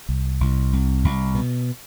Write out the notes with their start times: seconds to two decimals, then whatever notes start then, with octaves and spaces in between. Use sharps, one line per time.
0.09 C2
0.41 C2
0.73 C2
1.04 C2
1.35 B2